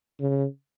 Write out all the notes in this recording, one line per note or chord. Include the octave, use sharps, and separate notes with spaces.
C#3